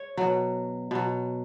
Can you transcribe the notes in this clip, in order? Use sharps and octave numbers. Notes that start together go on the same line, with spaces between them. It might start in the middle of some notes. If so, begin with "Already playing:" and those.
Already playing: C#5
B2 F#3
B2 F#3